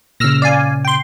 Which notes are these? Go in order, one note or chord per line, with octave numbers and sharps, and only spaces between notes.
A#2 C#3 E6 F6 A#6
D5 F5 G#5
G5 C6